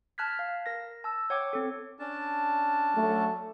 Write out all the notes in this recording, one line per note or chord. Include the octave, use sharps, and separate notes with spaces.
A5 F6 F#6 G#6 B6
F5
A#4 A#6
A5 E6
C#5 F#5 G5 D6 G#6
C4 A4
C#4 D4 A5
F#3 A3